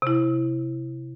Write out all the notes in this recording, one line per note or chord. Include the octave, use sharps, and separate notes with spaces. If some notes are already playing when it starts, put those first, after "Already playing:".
C3 E4